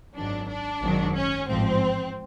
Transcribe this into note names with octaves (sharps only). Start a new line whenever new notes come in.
G#1 F#2 D#3 F#3 D4
D4
G#1 F#2 D#3 F#3
C#4
A1 G#2 F3 C4